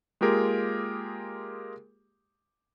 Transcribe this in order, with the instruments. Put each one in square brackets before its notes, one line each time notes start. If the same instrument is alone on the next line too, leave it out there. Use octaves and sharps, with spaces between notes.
[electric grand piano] G#3 A#3 F4 G4 G#4 A#4